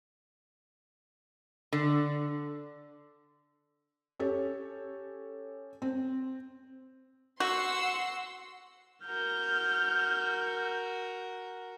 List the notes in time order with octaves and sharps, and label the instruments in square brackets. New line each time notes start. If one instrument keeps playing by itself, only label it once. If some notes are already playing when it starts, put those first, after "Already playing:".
[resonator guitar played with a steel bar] D3
[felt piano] C#4 G4 A4 C#5
C4
[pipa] F#4 [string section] F#5 C6 E6
[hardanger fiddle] F#4 A#4 [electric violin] F6 G6